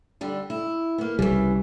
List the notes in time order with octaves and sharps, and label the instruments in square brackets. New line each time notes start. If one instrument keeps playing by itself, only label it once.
[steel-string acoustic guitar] D3 G3 D4
E4
A#3 B3
[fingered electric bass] C2 G3 [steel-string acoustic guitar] C#3 E3